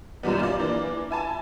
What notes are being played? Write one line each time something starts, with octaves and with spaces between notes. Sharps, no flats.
F#2 A#2 D#3 G3 B3
F4 D5
E3 A#3 D4
E5 G#5 A5